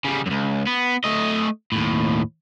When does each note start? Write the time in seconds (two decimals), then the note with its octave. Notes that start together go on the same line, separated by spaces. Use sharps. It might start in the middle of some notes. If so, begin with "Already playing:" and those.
0.04 C#3 G3
0.26 C#2 F#2
0.67 B3
1.04 A3 D#5
1.72 D#2 A2